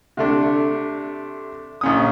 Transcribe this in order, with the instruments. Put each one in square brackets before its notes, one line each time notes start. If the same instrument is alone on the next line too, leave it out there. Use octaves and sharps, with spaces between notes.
[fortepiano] C3 A3 D4
A#1 C#4 D#6